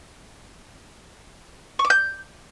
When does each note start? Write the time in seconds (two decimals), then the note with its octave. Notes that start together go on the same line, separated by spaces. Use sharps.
1.79 C#6
1.85 D6
1.90 G6